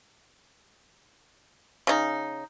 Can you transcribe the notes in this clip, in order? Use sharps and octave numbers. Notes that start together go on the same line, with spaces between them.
C#3 D#4